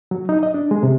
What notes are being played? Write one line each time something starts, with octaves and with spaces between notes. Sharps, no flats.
F#3
D#4
D#5
D4
G#3
C3